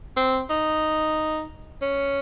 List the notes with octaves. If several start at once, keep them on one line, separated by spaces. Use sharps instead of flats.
C4
D#4
C#4